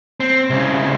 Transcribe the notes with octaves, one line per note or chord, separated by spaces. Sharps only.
C4
C2 C#3